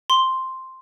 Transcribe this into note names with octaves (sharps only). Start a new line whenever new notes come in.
C6